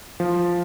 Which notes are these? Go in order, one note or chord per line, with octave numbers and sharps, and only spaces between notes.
F3